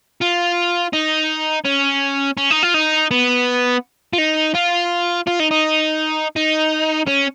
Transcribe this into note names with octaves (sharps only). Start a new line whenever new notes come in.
F4
D#4
C#4
C#4
D#4
F4
D#4
B3
F4
D#4
F4
F4
D#4
D#4
D#4
C#4